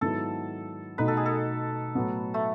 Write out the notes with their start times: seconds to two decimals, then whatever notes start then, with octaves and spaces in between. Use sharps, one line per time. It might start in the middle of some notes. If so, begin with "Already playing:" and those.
0.01 G#2 D#3 F#3 B3 E4 A4
0.98 B2 A3 D#4 B4
1.08 A4
1.17 G#4
1.26 A4
1.95 A2 F#3 B3
2.34 A3